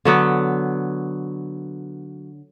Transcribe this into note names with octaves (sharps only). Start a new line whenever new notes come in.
D3 F#3 B3